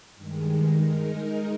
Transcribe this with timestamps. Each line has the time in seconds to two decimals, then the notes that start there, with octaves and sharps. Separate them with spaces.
0.16 G2 D#3 G#3
0.78 G#3 D#4 A#4